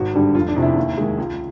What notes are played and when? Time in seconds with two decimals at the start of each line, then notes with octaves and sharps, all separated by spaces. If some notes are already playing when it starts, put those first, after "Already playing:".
Already playing: G#1 F#4
0.14 G2 D3 G3
0.35 F1 F4
0.48 D4
0.56 E2 C3 F3
0.62 E4
0.77 D#2
0.98 D#3 G#3
1.18 C#2